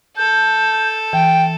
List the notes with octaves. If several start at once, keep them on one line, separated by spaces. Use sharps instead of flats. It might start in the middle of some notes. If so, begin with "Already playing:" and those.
A4 G6
E3 G5